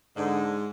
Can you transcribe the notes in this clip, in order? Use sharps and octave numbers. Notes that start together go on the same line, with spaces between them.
G#2 D3